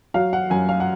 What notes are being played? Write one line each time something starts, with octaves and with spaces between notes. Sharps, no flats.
F#3 F5
F#5
F#2 G#5
F5
F#5